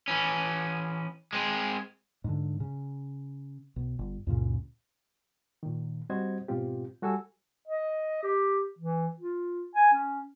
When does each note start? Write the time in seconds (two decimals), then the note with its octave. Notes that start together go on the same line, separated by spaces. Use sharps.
0.08 E3 C#4
1.33 G#3 C4
2.24 G#2 D3
2.60 C#3
3.76 B1
3.99 G1
4.27 C#2 F#2 A#2 C#3
5.63 A#2 D#3
6.10 G3 C4 F#4 C5 D#5 G#6
6.48 G#2 B2 C4 F4 G4
7.02 G3 F#4 A4 G#5 E6
7.67 D#5
8.23 G4
8.78 E3
9.20 F4
9.75 G#5
9.93 C#4